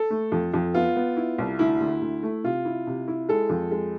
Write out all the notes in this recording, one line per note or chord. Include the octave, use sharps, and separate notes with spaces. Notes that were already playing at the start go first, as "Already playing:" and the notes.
Already playing: A4
A3
F2
F2
B3 F4
B3
E4
C2
D2 E4
D2
D2
A3
C3 F4
E4
C3
E4
G#3 A4
F2
G#3